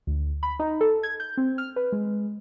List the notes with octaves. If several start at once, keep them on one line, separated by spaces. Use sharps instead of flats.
D2
B5
D#4
A4
G#6
G6
C4
F6
B4
G#3